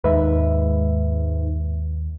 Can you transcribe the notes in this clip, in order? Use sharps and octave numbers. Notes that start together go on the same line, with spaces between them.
D#2 G#2 B4 E5